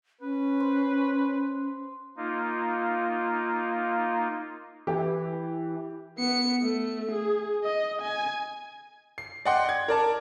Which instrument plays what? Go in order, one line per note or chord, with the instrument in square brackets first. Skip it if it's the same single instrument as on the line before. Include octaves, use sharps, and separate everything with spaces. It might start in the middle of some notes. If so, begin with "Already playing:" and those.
[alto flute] C#4 [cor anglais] B4
[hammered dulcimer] C5
[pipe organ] A#3 D#4 F4
[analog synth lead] E3 [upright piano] G4
[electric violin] B3 C#7
A3
G#4
D#5
G#5
[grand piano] C7
D5 D#5 F#5 G5 C6
G#6
A#4 D5 A5